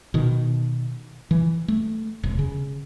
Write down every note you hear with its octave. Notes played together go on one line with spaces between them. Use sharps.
B2 D#3
E3
A3
E1
C#3